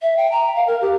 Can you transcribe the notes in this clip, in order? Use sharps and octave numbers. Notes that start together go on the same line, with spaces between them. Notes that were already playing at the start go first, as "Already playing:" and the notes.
E5
G5
A#5
F5
A#4
G4